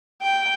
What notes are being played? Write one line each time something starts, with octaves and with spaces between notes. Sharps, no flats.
G5